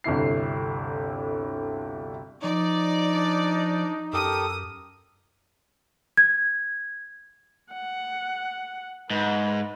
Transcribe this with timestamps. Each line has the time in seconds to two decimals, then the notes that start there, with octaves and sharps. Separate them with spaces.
0.04 G1 D2 C3 E4 C7
2.44 F3 D#4 D5
3.11 D4
4.13 F#2 G4 A4 A#4 D#6
6.17 G#6
7.73 F#5
9.11 G#2 B4